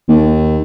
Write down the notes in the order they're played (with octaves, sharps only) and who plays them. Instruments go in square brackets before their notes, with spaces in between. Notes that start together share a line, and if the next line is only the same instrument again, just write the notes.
[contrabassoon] D#2